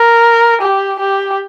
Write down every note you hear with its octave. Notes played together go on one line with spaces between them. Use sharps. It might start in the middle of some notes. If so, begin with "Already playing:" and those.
Already playing: A#4
G4
G4